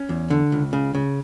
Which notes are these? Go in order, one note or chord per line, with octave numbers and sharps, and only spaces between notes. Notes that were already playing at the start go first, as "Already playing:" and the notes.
Already playing: C#4
E2
D3
C#2
C#3
C#3